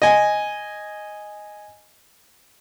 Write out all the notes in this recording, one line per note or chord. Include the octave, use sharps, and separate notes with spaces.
D#5 G#5